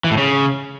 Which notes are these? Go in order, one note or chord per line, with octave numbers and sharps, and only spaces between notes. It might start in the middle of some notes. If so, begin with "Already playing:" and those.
E3
A2
C#3